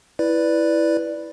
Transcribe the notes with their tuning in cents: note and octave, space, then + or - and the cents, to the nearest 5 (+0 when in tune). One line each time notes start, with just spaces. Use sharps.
E4 +0 B4 +0 D5 +0